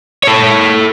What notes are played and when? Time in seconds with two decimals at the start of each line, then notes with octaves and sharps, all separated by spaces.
0.23 A4 C#5